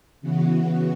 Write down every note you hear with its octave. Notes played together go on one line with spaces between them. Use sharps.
C#3 E3 B3 F#4